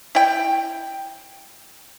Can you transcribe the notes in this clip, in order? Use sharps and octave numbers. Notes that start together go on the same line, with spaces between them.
E4 G5